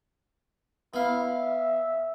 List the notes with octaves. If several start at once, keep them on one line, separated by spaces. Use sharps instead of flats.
B3 E4 F5
E5